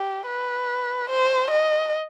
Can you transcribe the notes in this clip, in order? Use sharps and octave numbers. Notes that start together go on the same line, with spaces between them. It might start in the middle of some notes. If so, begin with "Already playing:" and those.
Already playing: G4
B4
C5
D#5